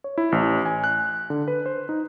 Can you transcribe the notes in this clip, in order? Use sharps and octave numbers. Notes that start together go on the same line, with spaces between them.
C#5
E4
A1
G#5
F#6
D3
B4
C5
D#4